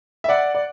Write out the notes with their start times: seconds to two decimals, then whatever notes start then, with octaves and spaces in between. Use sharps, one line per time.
0.24 E5
0.29 D5 F#5
0.55 D5